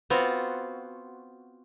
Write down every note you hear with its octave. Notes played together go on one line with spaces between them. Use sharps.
B3 C4 F4 F#4